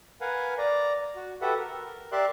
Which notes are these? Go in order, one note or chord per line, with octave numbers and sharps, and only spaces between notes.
A#4 B4 F5 F#5 G#5
D5 A#5
F#4
F#4 G4 A4 B4 E5 F#5
A#4
G4 A#4 D5 E5 C6 F#6